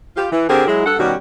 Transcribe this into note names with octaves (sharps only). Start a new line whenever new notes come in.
F4 G4
E3
D3 C4 G4 G#4 A#4 C5
F#3 G#3 E4
G2 A4 F#5
B2 D#3 G3 C#4 F#4 G4